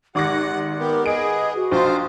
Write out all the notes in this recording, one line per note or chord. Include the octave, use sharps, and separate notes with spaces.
G#1 G4 F#5 D6 A#6
B3 G4 A#4
B3 G#4 D#5 D7
F#4
A#1 F4 C5